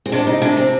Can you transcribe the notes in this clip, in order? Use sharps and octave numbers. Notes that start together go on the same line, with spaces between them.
C4
C3 D4
D#4
C3 D4
C4